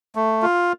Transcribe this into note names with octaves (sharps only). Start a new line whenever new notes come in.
A3
F4